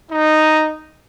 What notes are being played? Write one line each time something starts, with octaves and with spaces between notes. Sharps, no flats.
D#4